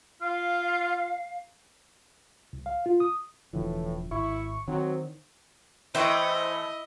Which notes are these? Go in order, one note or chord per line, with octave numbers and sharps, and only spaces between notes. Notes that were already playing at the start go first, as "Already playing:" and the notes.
F4 F5
C2
F5
F4
D#6
E1 A2 D3 E3 F3
G#1 E4 C#6
D#3 F#3 C4
E3 A3 E4 C5 D#5 G5 C#6